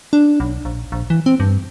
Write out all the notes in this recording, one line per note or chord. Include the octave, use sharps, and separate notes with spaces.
D4
B1
A#1
A#1
E3
C4
G2